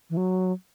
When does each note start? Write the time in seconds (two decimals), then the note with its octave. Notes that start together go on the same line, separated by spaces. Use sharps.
0.10 E3
0.17 F#3